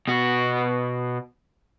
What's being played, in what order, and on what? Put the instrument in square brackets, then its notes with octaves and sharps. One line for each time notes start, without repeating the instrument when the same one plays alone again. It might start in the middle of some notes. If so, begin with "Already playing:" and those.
[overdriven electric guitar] B2 F#4